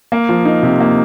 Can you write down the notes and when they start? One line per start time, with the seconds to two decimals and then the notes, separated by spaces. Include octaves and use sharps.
0.12 A#3
0.29 F3
0.45 D#4
0.63 C3
0.80 A#3